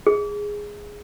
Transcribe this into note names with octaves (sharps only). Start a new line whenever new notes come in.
G#4